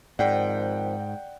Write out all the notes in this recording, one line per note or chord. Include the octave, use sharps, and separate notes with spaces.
G#2 D#3 F3 C4 D5 F#5 G5